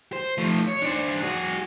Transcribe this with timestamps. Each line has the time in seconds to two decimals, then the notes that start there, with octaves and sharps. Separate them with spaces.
0.13 C5
0.38 F3 A3
0.68 C#5
0.82 D4 C5
1.22 F#4 G#4